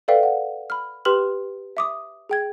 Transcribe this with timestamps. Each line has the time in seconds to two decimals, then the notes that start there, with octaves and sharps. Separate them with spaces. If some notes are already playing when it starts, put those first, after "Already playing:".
0.08 A4 B4 D5 E5 F5 G5
0.23 F#5
0.70 B5 F6
1.05 G4 B4 G5 C6 F6 F#7
1.77 E5 D6 D#6
2.29 G#4 G5 G#6